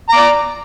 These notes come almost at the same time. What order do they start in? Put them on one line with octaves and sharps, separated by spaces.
A#5 D6 D5